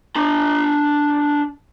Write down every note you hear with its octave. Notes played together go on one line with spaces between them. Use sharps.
D4 A#5